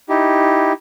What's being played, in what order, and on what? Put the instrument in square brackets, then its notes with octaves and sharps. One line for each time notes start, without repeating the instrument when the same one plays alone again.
[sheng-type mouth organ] D#4 E4 G4